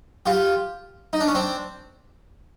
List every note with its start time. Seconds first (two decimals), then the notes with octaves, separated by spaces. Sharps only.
0.26 F4 G4
1.13 D#4
1.20 D4
1.27 C#4
1.35 C4 D4